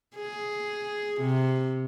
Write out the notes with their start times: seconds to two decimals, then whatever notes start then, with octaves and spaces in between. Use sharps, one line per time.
0.16 G#4
1.20 C3